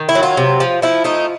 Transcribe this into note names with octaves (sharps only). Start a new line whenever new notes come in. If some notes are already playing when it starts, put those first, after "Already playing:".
Already playing: D#3
E4
F#3
F4
C3
F3
F3 E4
A3 D#4